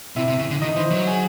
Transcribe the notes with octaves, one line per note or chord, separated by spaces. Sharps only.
C3 E4 E5
C3
C#3
D3
D#3 D#4 D#5
E3 C5
F#3
G#4 G#5